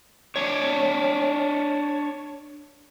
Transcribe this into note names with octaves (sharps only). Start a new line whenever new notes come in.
D4 C#5